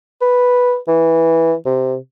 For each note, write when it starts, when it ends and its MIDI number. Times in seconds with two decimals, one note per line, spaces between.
0.21 0.77 71
0.88 1.55 52
1.66 1.96 48